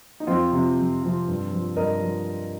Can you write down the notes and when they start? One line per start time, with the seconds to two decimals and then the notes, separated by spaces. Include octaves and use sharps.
0.20 D#4
0.27 F2 C4 F4
0.52 C3 F3
0.77 F2
1.02 C3 F3
1.27 G2
1.52 F3
1.76 G2 A#4 D#5
2.01 F3